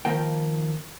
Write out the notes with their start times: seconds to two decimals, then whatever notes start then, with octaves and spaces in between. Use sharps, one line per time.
0.05 D#3 F3 A#3 G5